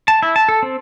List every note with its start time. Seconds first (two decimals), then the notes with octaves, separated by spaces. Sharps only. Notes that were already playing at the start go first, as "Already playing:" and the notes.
0.08 A5
0.23 E4
0.36 A5
0.49 A4
0.63 C4